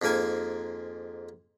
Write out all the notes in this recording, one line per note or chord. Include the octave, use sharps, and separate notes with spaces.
F2 G#2 A#3 A#4 G#5